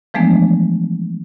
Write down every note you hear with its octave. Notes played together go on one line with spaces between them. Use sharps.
E3 F3 G#3 A3 B3 D4